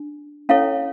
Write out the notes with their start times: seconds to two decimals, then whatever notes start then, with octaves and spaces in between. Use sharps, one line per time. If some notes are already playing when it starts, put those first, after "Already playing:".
Already playing: D4
0.49 C#4 E4 A4 C#5 F5